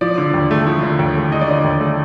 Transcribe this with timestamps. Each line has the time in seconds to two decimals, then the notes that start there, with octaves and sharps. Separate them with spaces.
0.01 F3 D5
0.18 D3
0.34 D#2
0.51 A3
0.67 F3
0.82 D3
0.99 D#2
1.16 A3
1.32 F3 D#5
1.41 D5
1.48 D3 D#5
1.64 D#2
1.81 A3